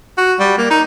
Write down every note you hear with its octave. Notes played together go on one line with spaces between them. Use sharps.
F#4
G3
A#3
D#4